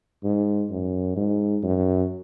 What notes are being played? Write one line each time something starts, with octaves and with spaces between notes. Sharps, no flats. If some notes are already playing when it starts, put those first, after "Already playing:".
G#2
F#2
G#2
F#2